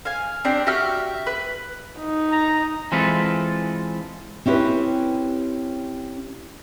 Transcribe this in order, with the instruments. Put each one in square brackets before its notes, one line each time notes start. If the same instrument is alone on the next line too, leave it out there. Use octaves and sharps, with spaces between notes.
[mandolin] F5 G#5
C4 D4 G4 D5
F#4 G4 E5 F6
B4
[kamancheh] D#4
[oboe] A#5
[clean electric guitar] E3 G#3 C4 F4 A4 B4
[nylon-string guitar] C4 C#4 E4 G4 B4